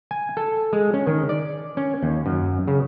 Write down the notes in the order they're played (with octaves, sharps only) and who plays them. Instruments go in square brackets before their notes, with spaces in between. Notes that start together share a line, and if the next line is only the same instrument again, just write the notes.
[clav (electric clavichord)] G#5
A4
G#3
C#4
D#3
D5
C#4
D#2
F#2
C#3